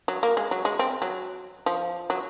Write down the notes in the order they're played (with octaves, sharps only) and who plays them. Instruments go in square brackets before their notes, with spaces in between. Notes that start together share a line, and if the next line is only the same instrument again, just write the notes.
[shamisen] F#3
A#3
G#3
F#3
G#3
C4
F#3
F3
F#3